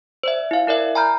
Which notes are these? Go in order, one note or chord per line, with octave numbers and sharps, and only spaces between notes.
C5 D5 E5
E4 F5
E4 A#4 D5 E5
G#5 A#5 B5 F6 G6